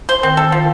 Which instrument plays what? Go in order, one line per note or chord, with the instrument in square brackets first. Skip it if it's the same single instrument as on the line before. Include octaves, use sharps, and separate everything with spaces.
[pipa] C5
[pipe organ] D#3 [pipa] C4
[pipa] A4
F3